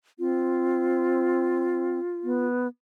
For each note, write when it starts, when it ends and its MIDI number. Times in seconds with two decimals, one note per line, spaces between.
0.19 2.00 60
0.19 2.46 65
2.24 2.67 59